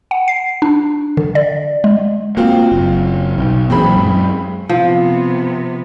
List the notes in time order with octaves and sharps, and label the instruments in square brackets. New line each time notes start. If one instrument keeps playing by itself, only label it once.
[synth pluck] F#5
C7
D4
D3
D5
G#3
[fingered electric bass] A#3 [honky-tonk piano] C4 F4 F#4
[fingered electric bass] F#1
B1
[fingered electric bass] A#2 E3 F#3 [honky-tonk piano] C4 G#4 B5
[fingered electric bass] F#2 G#3
[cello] C3 B3 [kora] F3